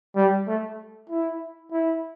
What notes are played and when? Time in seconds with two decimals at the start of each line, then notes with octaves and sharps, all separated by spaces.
0.16 G3
0.47 A3
1.10 E4
1.72 E4